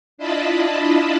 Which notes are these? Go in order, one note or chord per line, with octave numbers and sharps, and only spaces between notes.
D4 E4 F4 D#5 A5 B5